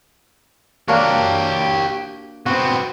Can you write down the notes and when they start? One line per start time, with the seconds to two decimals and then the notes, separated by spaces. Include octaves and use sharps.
0.88 A#3 D4 F#4 G4 C#5
2.46 B3 C4 F#4